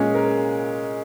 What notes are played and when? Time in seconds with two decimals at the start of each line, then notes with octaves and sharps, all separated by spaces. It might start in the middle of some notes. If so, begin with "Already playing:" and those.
Already playing: A#2 G#3 C#4 G#4
0.14 A#4